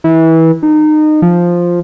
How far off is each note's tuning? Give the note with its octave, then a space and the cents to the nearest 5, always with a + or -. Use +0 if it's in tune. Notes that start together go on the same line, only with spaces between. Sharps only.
E3 -25
D#4 -25
F3 +0